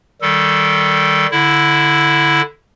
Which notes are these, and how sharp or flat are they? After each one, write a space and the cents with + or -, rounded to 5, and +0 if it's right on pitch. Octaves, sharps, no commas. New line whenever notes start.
D#3 +0 G3 -15 A4 +0
D3 +0 E4 +0